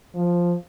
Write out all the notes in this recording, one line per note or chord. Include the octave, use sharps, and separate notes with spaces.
F3